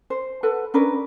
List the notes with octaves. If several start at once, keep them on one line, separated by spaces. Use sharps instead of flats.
C5
A4 B4 F#5
C#4 D4 A#4 B4